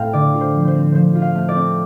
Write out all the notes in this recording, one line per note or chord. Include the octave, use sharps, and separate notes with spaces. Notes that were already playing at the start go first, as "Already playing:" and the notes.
Already playing: A2 A3 C4 F5 G5
D3 D5
F4
C5
F3
C5
C4
F3 C5
F4
F5
A3
D5
C4